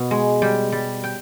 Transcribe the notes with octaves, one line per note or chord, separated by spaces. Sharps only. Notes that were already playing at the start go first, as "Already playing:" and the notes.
Already playing: B2 B3
G#3
G3 G5
G3
G5